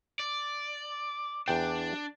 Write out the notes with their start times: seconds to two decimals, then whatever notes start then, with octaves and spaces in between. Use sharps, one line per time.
0.20 D5
1.48 E2 D4 G5